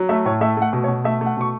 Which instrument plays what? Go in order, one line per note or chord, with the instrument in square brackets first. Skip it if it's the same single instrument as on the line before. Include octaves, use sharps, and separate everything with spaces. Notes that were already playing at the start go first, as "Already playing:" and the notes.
Already playing: [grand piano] F#3
A3 E5
A2 C#5
A3 E5
A3 F#5
B2
C#5
B2
A3 E5
A3
F#5
B2 C#6